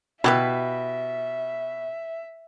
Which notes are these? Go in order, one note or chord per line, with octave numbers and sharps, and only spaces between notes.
B2 E4 G4 B4 E5